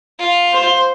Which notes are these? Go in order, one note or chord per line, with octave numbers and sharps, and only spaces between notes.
F4
C5